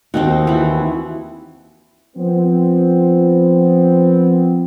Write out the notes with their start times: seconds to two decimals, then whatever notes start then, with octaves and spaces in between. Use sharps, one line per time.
0.14 D#2 C4 D#4 F#4
0.47 E3 F#4
2.16 F3 B3 C4